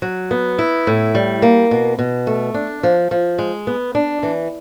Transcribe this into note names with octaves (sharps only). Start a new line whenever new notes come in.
F#3
B3
E4
A2
G3
A#3
B2
B2
A3
D4
F3
F3
G#3
B3
D4
E3